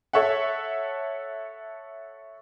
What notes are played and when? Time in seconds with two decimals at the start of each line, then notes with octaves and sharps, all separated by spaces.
0.13 A4 C#5 E5 F#5